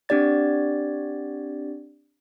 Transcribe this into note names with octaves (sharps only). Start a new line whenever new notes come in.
C4 D4 G4 D5 A6